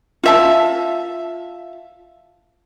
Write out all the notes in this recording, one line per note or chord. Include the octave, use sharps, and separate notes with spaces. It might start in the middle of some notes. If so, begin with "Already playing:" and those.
F4 E5 A5